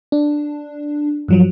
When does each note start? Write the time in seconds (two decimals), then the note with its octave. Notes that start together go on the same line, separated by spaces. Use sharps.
0.12 D4
1.28 G2 F3 F#3